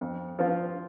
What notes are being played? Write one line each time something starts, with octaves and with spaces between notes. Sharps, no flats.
F2
F3 C4 F4